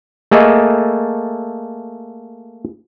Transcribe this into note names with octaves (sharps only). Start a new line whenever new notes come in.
A3 A#3 G#4 A4 D#5